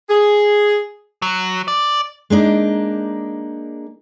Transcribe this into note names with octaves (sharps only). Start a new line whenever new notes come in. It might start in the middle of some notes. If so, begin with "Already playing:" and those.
G#4
F#3
D5
G#3 A#3 D4 D#4